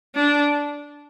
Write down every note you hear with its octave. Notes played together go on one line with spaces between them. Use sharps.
D4